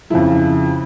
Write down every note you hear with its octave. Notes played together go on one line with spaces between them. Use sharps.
F2 C#3 F3 E4